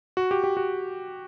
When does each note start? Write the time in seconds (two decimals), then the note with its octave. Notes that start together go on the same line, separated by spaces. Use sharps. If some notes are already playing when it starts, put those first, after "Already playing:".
0.17 F#4
0.31 G4
0.44 G4
0.57 F#4